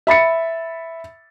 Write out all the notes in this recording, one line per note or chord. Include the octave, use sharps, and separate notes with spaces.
E5 B5 A6 C#7